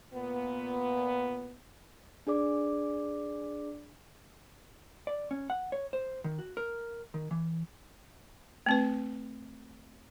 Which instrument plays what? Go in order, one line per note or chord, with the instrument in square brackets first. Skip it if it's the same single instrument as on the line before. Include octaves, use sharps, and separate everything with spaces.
[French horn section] A#2 B3
[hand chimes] D4 G#4 D5 D6
[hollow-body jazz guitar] D5
C#4
F#5
C#5
C5
D#3
F#4
A#4
D#3
E3
[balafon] A3 C4 B4